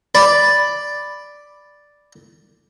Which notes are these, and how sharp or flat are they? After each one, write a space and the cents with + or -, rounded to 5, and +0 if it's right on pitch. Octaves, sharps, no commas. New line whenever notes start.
D5 +0 B5 +0